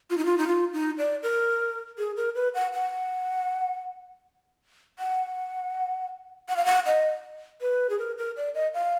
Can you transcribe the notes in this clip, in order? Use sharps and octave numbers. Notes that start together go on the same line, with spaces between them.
F4
D#4
F4
D#4
F4
D#4
D5
A#4
G#4
A#4
B4
F#5
F#5
F#5
F#5
F5
F#5
D#5
B4
G#4
A#4
A#4
D5
D#5
F5